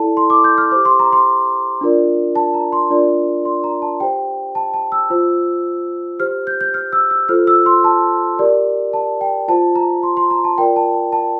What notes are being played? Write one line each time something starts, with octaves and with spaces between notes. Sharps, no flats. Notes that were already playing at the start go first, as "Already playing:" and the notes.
Already playing: E4 A4 D5 A5
C6
D6
G6
F6
G4 C5 D6
C6
A#5
C6
D4 F4 A#4 D5
A5
A#5
C6
D4 F4 A#4 D5
C6
A#5
A5
G4 C5 G5
A5
A5
E6
F4 C5
G4 C5 F6
G6
G6
F6
E6
E6
F4 A4 C5 F6
E6
C6
A5
G4 A#4 D5
A5
G5
F4 C5 A5
A#5
C6
C6
A#5
A5
F4 A#4 D5 G5
A5
A5
A5